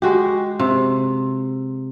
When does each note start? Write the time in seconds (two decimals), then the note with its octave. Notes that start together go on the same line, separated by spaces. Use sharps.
0.02 G#3 F#4 G4
0.59 C3